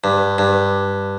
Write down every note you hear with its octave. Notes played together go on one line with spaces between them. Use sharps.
G2
G2